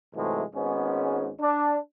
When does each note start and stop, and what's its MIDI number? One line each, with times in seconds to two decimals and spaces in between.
0.15 0.43 44
0.15 0.43 48
0.15 0.43 52
0.15 0.43 54
0.15 0.43 56
0.15 0.43 57
0.55 1.31 32
0.55 1.31 44
0.55 1.31 56
0.55 1.31 59
0.55 1.31 61
1.41 1.78 62